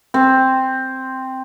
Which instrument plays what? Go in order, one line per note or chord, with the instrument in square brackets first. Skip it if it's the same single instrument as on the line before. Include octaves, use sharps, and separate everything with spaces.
[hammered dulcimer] C4